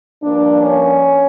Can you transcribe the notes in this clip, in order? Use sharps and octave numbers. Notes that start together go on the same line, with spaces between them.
G2 F3 A#3 D4
C#4